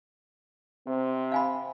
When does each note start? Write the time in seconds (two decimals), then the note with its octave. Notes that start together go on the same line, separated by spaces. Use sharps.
0.87 C3 C4
1.32 F5 G#5 B5